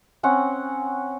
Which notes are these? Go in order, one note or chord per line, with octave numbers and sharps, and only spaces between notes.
C4 C#4 F#5